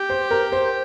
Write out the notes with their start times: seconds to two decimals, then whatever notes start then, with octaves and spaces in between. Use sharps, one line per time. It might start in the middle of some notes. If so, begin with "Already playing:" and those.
Already playing: G4
0.09 C5
0.31 A#4
0.52 C5